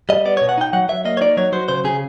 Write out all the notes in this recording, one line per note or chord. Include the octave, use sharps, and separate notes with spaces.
G3 D#5
B3 D5
C#5
B2
F#5
D#4 G5
F#3 F#5
F#3 E5
A#3 D#5
C#5
D#4 D5
F#3 C#5
F#3 C5
C#3 C5
C#3 G#4